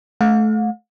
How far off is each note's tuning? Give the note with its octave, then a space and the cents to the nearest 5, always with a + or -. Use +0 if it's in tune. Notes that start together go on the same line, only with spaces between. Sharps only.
A3 -25 F5 +45